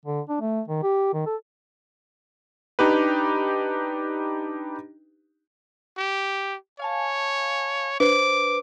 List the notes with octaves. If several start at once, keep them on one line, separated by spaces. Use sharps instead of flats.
D3
D4
A3
D#3
G4
D#3
A4
D4 D#4 G4 B4
G4
C#5 F5 G#5 A5
D4 B4 C5 D6